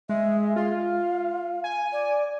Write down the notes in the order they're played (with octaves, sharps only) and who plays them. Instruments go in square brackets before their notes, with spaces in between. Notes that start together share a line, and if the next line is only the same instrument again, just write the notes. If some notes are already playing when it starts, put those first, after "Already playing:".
[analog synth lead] G#3 [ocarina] E5
[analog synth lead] F4 [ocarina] F5
[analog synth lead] G#5
[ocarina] D5